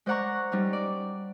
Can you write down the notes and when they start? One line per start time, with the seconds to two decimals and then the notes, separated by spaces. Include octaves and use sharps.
0.06 G#3 C5 D5 F#5 A#5 C#6
0.52 G3 C#4 D#4
0.73 D5